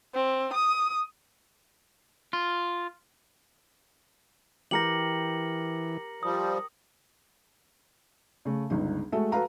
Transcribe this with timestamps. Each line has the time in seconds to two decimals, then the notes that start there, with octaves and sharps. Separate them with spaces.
0.14 C4
0.53 D#6
2.33 F4
4.71 E3 G4 A#4 G5 A#6 C#7 F#7
6.23 F3 G3 D#6
8.45 C#3 A3
8.70 G1 C#2 D#4
9.12 G#3 A3 F#4 A4 E5
9.32 F#4 A4 B4 F5 A#5